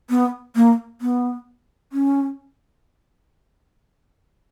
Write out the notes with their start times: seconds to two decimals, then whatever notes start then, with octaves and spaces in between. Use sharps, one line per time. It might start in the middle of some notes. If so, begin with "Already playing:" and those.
0.10 B3
0.56 A#3
1.01 B3
1.93 C#4